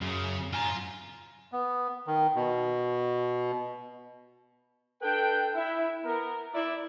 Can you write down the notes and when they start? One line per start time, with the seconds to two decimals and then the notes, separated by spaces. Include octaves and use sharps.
0.01 F#2 C#3
0.53 F#2 F4 G#5 A#5
1.52 B3
2.07 D#3
2.35 B2
5.02 D4 A4 B4 G5
5.55 E4
6.05 B3 A#4
6.54 E4 D5